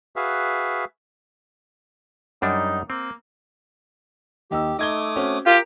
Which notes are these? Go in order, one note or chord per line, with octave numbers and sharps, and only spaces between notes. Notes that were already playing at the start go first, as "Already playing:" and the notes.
F#4 G#4 B4 E5 F5
F#2 G3 D4 D#4
A#3 C4
D#2 D#4 G4 E6
A3 D#4 D6 D#6 G#6 G7
C4 C#4 F#4
F4 G4 A#4